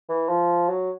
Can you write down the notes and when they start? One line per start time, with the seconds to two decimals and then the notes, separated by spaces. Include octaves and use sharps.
0.09 E3
0.29 F3
0.69 F#3